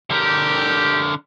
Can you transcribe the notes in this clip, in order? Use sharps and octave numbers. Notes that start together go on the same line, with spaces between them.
D3 G4 A#4